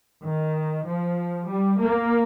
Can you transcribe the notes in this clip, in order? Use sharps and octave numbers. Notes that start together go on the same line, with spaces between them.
D#3
F3
G3
A#3